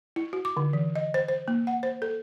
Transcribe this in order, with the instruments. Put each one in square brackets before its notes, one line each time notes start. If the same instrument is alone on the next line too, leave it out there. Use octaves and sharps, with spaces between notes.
[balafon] E4
F#4
D6
D3
E3
D#5
C5
C5
A#3
F#5
C5
A4